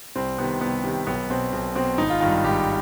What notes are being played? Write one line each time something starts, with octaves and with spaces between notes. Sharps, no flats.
C2 C4
C3 D#3 B3
C2 B3
C3 D#3
B1 B3
B2 C4
B1
B2 C4
G#1 D#4
F4
G2 D#3 F4
G#1 G4